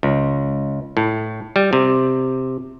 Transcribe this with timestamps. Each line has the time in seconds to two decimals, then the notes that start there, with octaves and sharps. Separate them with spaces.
0.03 C#2
0.97 A2
1.56 G3
1.73 C3